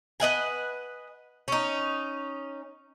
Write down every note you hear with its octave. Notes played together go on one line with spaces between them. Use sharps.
B4 D#5 F#5 G#5
C#4 D#4